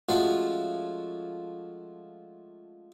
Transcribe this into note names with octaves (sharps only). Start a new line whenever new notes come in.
F3 G#3 A3 C#4 F4 F#4